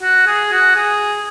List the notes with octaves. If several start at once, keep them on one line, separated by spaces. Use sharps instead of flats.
F#4
G#4
F#4
G#4